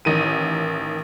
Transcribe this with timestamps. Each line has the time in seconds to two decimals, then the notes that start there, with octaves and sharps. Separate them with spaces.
0.05 A1 D#3 D#7